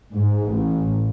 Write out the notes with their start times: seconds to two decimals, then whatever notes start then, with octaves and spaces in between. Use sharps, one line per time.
0.12 G#2
0.49 A1